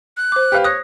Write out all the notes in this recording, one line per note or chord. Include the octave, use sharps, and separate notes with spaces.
F#6
C5 D6
G4 B4 F5
C#5 D#6 F#6 A#6